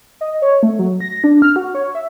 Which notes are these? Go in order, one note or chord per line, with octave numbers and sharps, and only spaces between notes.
D#5
C#5
A3
F#3
A#6
D4
F6
F#4
C#5
E5